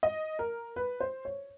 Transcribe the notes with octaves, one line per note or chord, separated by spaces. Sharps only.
D#5
A#4
B4
C5
C#5